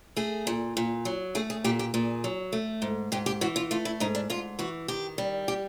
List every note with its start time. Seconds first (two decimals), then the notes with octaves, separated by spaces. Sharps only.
0.17 A3 G#4
0.47 A#2
0.77 A#2
1.05 F#3
1.35 A3 G#4
1.50 G#4
1.64 A#2 G4
1.79 G4
1.94 A#2 G#4
2.24 F#3
2.53 A3
2.82 G#2
3.12 G#2 G4
3.26 G4
3.41 E3 F#4
3.56 F4
3.71 A3 F4
3.85 E4
4.00 G#2 D#4
4.15 D4
4.30 G#2 F4
4.59 E3 F#4
4.88 D#3 G4
5.18 G3
5.48 G4